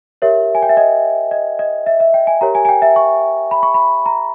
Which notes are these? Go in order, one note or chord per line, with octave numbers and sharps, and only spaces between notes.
G4 A#4 C#5 E5
G#5
G5
E5
D#5
D#5
D#5
E5
E5
G5
G#5
G4 A#4 C#5 A#5
G#5
G#5
G5
E5
C#6
B5
C#6
B5
A#5